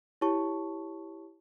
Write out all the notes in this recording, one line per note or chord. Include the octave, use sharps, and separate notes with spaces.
E4 G4 C#5 A5 C#6